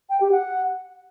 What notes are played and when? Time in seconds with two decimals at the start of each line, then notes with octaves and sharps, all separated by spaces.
0.10 G5
0.21 G4
0.32 F#5